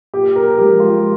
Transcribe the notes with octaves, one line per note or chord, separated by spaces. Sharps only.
A#2 G4
A#4
F3 G#3 G4
F4